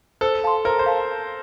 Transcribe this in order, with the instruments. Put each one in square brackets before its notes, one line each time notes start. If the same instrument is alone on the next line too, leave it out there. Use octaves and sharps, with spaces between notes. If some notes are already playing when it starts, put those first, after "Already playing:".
[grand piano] A4 [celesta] C5
[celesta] F5 A5 C6
[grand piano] A#4 [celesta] C5
[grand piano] C5
[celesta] F5 A5